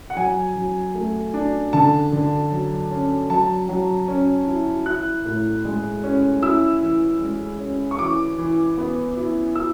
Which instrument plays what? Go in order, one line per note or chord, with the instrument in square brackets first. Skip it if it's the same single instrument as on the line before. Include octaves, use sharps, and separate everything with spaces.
[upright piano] F#5
F#3 G#5
F#3
A3
D4
D3 A5
D3
F#3
C#4
F#3 A5
F#3
C#4
E4
E4 F#6
A2
G#3
C#4
E4 E6
E3
G#3
C#4
C#6
E3 D6
E3
B3
E4
E4 E6